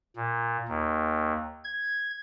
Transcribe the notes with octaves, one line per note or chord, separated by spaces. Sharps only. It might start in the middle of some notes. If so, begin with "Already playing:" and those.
A#2
D#2
G#6